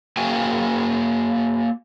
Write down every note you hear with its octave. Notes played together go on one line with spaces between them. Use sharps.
A#3 F#4 G#4 G5 G#5